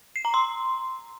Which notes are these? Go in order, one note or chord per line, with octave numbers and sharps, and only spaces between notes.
C7
A#5
C6